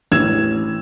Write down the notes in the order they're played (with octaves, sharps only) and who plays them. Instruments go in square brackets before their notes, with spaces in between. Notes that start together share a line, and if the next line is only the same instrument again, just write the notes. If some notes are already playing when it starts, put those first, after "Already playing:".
[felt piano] A1 E6 G#6 E7